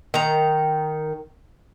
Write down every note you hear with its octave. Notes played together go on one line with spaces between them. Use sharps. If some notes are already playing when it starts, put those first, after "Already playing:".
D#3 A#5